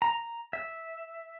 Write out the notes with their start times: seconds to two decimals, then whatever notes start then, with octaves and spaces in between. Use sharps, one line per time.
0.02 A#5
0.53 E5